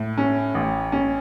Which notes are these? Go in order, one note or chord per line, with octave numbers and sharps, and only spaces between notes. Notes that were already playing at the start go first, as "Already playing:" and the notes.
Already playing: A2
C#4
A1
C#4